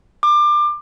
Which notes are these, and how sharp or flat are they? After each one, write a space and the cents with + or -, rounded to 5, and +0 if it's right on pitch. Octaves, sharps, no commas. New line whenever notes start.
D6 +25